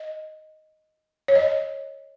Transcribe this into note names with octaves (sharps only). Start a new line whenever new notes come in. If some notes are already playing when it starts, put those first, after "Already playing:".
Already playing: D#5
C#5
D#5